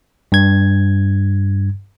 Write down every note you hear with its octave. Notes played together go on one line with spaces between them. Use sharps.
G2 G#6